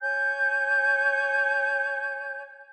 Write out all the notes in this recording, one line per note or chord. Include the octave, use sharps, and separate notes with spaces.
C#5 G#5 G6